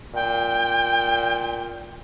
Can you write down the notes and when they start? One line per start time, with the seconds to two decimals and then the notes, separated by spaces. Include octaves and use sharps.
0.15 A#2 G5